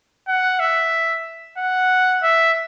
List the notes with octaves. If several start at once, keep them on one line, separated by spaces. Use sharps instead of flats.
F#5
E5
F#5
E5